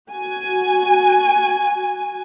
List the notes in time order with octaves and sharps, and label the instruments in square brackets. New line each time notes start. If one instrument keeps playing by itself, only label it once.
[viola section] F#4 G#5